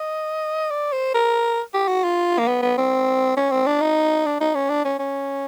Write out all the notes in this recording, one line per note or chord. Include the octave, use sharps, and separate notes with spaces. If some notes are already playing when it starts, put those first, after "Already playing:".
Already playing: D#5
D5
C5
A#4
G4
F#4
F4
A#3
B3
B3
C4
C#4
C4
D4
D#4
D4
D#4
C#4
D4
C#4
C#4